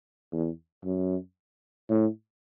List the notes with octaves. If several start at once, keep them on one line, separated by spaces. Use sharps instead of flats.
E2
F#2
A2